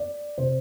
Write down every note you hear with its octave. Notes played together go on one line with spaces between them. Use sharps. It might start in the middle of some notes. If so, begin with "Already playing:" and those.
Already playing: D5
C3 C5